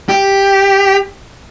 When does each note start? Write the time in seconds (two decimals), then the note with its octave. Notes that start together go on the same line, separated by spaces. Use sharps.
0.09 G4